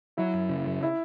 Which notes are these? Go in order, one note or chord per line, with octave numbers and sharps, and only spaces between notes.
F#3 E4
F#2
C#3
F#2
E4